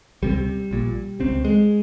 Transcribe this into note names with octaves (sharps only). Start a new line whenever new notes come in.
C#2 C3 G3
A#1 A#2
C#2 C#3 C4
G#3